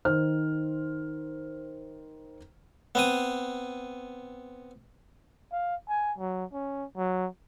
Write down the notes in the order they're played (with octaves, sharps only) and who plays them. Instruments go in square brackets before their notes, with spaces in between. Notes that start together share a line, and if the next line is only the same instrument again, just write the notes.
[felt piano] D#3 C5 F6
[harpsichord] B3 C4 D#6
[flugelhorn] F5
G#5
F#3
C#4
F#3